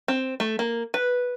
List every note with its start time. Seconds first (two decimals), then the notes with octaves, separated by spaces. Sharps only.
0.08 C4
0.40 A3
0.59 A#3
0.94 B4